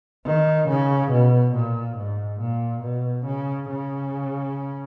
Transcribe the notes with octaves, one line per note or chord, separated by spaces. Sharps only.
D#3
C#3
B2
A#2
G#2
A#2
B2
C#3
C#3